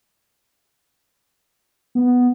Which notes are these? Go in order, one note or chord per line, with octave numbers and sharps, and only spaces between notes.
B3